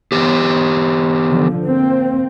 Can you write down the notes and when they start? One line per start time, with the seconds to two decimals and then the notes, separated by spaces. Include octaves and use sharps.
0.12 E3 B3 G4
1.29 D3 F3
1.66 A#3 C4